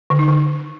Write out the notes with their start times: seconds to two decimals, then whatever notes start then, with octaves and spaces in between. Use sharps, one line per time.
0.10 D3
0.19 D#4
0.28 D3